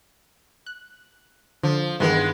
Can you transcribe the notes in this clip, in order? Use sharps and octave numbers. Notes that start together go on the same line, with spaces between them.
F#6
D3 F3
G2 D#3 E3 G#3 B3